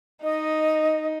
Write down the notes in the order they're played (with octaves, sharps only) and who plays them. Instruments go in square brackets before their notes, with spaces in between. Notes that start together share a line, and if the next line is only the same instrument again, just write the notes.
[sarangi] D#4 [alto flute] D#5